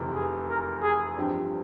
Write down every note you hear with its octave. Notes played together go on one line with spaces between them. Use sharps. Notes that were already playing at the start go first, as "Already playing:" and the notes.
Already playing: F1 E2 C3 E3
G#4
A#4
G#4
G2 F3 C4 G4